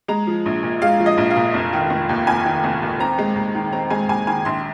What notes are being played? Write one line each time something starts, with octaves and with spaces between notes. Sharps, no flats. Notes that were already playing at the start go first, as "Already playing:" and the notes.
G#3 A#5
F3
A#1
A#2
G#3 F5
F3
D#5
A#1
F5
A#2
F1
D#3
F1
D#2
F1 G#5
D#3
F1
D#2
C4 A#5
G#3
D#2
D#3
C4 A#5
G#3 G#5
D#2 G#5
D#3 G#5
A#1 C6